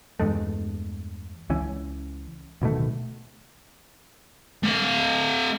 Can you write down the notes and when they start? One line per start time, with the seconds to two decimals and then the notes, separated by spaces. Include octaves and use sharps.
0.20 E2 G2 G#3 A3
1.50 C#2 E3 C#4
2.62 D1 B2 D#3 A3
4.63 A3 F5